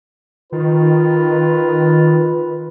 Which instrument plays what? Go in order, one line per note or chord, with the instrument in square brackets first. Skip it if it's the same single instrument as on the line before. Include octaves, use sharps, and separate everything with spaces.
[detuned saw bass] D#3 [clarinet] F4 [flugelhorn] B4